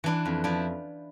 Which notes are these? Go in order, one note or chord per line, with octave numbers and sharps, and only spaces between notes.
E3 D4 E4
F2
F3 D4 E4